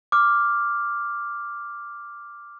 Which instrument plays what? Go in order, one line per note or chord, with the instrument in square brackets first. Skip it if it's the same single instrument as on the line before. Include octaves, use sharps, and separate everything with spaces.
[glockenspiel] D6 F6